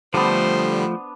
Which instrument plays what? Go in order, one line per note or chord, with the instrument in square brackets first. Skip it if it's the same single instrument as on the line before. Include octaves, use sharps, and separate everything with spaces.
[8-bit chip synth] D3 G3 [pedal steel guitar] F3 A3 [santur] B3 D4 [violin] C5